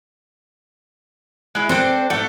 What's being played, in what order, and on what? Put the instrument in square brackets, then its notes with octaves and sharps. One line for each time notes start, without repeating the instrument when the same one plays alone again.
[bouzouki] G#3 E4
[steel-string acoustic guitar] C4 [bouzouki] D4 A4 C5
[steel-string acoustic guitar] G#2 [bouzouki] A3 A4 F#5